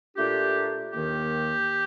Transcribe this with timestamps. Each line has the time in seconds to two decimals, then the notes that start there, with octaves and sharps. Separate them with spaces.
0.15 A#2 A3 D4 F4 G4
0.93 D#2 D#3 A#3 G4